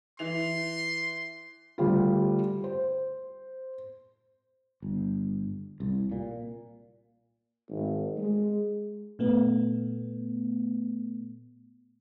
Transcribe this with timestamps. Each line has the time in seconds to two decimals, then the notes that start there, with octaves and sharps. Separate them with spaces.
0.19 E3 C6 F7
1.78 D2 G3 F4
2.64 C5
4.82 G1
5.80 C2
6.12 A#2
7.70 G#1
8.18 G#3
9.19 A#2 A3 B3